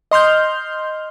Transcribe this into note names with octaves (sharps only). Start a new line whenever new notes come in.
D#5 C6 F6 G6